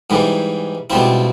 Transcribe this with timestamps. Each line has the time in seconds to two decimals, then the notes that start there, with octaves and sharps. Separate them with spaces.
0.10 G#2 E3 G3
0.90 C#2 B2 G3 C4 E4